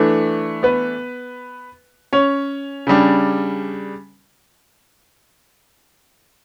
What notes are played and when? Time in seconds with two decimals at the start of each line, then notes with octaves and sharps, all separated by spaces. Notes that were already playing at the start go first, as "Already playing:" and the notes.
Already playing: E3 A3 D4
0.63 B3 B4
2.13 C#4 C#5
2.87 C#3 G3 D4